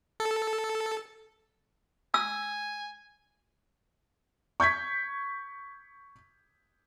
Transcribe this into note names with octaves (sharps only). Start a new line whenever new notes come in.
A4
G#5 E6
C#6 G6 G#6 B6